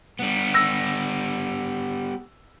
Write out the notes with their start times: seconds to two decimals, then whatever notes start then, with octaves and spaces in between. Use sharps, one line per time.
0.20 G3 B3
0.54 E6 A#6